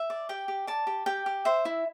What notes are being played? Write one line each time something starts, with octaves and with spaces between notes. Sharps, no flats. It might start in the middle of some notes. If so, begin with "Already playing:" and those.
Already playing: E5
D5
G4 G5
G4
D5 A5
G4
G4 G5
G4
C5 E5
E4